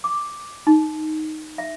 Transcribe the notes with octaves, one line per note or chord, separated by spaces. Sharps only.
D6
D#4
E5